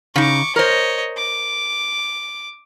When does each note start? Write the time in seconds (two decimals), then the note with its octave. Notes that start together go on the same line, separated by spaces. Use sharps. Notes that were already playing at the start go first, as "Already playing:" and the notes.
0.16 C#3 D#4 C#6 D6
0.56 A#4 C5 C#5 D#5
1.17 D6